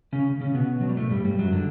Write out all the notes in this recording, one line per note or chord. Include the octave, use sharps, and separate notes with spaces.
C#3 C#4
C#3 C#4
B2 B3
F#3
G3
A2 A3
G2 G3
G2 G3
F#2 F#3
D3